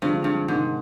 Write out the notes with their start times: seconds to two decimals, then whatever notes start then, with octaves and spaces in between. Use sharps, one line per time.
0.02 G2 D3 F3 G#3 C4
0.24 G2
0.48 G#2 C3 D#3 G#3